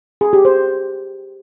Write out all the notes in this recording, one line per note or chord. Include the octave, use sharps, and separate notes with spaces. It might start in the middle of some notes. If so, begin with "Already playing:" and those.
G#4
G4
C5